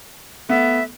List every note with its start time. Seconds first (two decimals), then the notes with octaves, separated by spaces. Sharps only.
0.49 A3 B3 E5